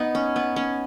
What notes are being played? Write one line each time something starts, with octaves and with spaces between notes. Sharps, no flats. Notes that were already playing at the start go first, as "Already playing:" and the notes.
Already playing: B3 D#4
C#4
B3
C#4